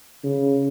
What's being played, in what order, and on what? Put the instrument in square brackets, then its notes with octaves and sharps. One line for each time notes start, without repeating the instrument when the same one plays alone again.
[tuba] C#3